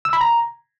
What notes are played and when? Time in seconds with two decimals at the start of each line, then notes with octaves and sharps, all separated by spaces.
0.05 E6
0.13 B5
0.21 A#5